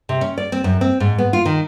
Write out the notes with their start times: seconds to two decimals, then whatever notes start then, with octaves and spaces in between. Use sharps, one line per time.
0.09 C3
0.21 C#4
0.38 D5
0.52 C4
0.64 F#2
0.81 C4
1.00 G#2
1.18 B3
1.33 F4
1.46 D#3